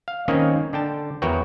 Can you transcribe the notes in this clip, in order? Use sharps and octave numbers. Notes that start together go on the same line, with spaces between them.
F5
D#3 A#3 C4 C#4 C#5 D#5
D3 G5 A5
E2 F#4 A#4 B4 C#5 G5